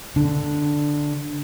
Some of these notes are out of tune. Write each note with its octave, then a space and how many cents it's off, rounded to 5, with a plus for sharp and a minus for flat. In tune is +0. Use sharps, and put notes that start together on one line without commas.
D3 +0 D4 +0